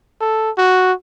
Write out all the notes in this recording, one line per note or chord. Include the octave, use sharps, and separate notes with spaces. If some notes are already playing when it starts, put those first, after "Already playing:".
A4
F#4